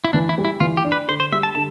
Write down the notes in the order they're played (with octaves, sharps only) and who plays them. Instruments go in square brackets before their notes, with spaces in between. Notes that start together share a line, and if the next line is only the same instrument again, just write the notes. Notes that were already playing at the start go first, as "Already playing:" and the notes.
[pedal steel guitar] E4
[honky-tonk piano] E3 [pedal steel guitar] D4
[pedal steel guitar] E4
[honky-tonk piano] G3
[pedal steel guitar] E4
[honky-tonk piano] E3 [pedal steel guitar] F4
[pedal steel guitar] G4
[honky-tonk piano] D4
[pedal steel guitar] B4
[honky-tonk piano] D3 [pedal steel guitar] C5
[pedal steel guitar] C5
[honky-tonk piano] G3 [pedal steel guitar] E5
[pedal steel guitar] A5
[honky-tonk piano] D3 [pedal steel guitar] A5